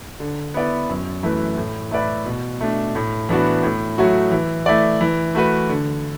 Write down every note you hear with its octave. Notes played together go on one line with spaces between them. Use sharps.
D3
B3 E4 B4 D5
F#2
E3 A3 E4 B4
A2
A3 E4 B4 D5
B2
A3 D4
A2
E3 B3 D4 F#4
A2
F#3 A3 F#4
E3
A3 E4 D5
E3
A3 F#4 B4
D3